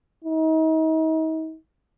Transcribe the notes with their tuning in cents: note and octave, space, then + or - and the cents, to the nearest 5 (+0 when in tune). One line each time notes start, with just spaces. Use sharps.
D#4 +40